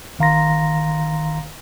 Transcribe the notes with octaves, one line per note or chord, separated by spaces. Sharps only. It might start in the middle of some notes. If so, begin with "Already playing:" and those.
G1 D#3 F5 A#5 C6 A#6